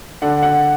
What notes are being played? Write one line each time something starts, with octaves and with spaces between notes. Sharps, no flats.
D3 F#5
F#5